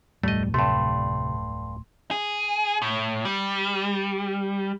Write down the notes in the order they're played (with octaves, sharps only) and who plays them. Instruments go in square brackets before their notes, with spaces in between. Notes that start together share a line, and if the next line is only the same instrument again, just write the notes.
[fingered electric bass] D1 F2 A2 [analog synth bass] G3 [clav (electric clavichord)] A3 D#5
[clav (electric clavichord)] G2 A3 [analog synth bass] C3 [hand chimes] C6
[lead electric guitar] G#4
A2
G3